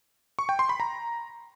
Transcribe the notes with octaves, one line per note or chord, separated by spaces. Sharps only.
C#6
G5
C6
B5
A#5